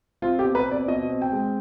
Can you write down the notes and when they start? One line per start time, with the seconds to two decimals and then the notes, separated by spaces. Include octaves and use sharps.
0.22 C4 F4
0.39 G4
0.44 B2
0.55 B4
0.66 C4
0.71 D5
0.88 B2 D#5
1.10 C4
1.22 G5
1.32 G#3